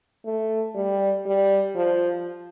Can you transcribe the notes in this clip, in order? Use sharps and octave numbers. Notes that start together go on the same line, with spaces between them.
A3
G3
G3
F3